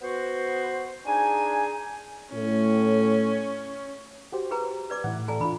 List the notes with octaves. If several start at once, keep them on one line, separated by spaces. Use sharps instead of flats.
B3 F#4 C5
D4 D#4 G#4 G#5
A2 C#4
F#4 G4 C5
G#4 B4 A#5
B4 D5 D6
A2 E3 E4 F#5
A4 D5 G#5 A#5
D4 F4 B5